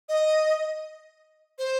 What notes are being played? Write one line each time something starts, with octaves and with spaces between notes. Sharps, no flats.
D#5
C5